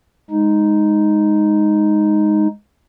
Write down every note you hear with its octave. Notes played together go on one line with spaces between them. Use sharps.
G#3 D#4